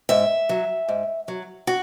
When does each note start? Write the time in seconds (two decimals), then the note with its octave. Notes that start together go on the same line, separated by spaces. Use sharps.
0.09 G#2 E5
0.49 F#3
0.89 G#2
1.28 F#3
1.67 F#4